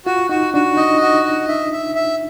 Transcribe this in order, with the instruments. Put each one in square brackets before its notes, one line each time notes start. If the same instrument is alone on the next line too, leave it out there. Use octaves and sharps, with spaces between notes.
[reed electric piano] F4 [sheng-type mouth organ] F#4
[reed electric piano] D#4 [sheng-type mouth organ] F#4
[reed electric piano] D4 [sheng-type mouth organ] F#4
[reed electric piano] D#4 [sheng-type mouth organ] D#5
[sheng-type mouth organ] F#4
D#5
E5
E5
E5